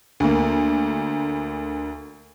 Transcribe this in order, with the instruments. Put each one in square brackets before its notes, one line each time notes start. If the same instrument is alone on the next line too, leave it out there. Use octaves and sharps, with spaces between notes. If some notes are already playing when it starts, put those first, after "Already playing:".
[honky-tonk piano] D2 A#3